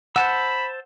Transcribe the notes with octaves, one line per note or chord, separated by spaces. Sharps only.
C5 F#5 A5 B5 E6